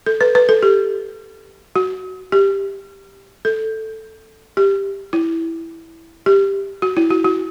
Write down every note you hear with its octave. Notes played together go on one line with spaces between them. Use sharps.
A4
B4
B4
A4
G4
F#4
G4
A4
G4
E4
G4
F#4
E4
F#4
F#4